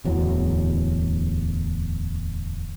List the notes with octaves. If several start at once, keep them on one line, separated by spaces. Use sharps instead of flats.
D1 E2 F#3